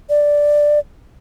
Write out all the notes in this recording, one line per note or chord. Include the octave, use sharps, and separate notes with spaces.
D5